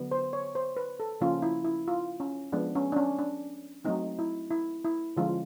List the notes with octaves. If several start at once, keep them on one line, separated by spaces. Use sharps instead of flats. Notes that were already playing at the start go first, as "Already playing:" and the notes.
Already playing: D3 F#3 B3
C5
C#5
C5
B4
A4
C#3 F3 A#3 C#4 F4
E4
E4
F4
C#4
F3 G#3 B3 D4
C#4
D4
C#4
D4
F#3 A3 C4 D#4
E4
E4
E4
D3 F3 G#3 C#4 F4